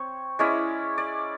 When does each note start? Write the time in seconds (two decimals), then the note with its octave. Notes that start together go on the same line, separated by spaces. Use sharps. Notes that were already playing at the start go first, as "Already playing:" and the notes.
Already playing: C4 C#5
0.39 G#3 C#4 E4 D5
0.98 D5